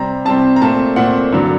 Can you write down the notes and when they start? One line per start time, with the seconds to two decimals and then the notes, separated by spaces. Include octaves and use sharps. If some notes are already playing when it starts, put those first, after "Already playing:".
Already playing: C3 G3 C4 A#5
0.25 C3 G3 C4 A5
0.56 A#5
0.61 A#2 A3 C4 A5
0.96 A#2 A3 C4 F#5
1.33 G2 D3 F#3